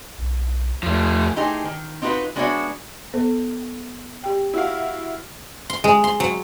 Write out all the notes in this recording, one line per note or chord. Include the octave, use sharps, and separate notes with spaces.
B1
E2 F3 A3
E3 A3 D#4 G4 G#4 C5
D#3
C4 D#4 F4 F#4 B4
G#3 B3 D4 F#4 C#5 E5
B3 A4 C5
G4 G5
E4 F#4 F5
C6
G#3
C6
F#3